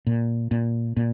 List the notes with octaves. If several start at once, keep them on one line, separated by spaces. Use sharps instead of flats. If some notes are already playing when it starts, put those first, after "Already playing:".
A#2
A#2
A#2